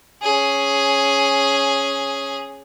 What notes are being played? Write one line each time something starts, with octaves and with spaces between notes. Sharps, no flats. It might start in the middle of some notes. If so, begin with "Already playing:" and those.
C#4 G#4